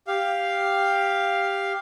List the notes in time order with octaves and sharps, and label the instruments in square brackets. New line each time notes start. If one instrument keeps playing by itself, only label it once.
[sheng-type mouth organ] G4 F5